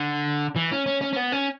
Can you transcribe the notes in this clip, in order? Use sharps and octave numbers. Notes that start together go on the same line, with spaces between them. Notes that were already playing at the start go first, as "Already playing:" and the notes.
Already playing: D3
E3
C#4
C#4
C#4
C#4
B3
C#4